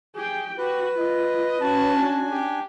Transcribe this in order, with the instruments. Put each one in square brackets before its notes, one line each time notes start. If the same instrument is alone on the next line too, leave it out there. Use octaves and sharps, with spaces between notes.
[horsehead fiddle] G4 G5 [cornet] G#4
[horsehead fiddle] F#4 [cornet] G4 [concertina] B4
[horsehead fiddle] F4 [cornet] D#5
[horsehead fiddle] C#4 F#4 [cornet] A5
[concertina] D4 G#5
[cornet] G4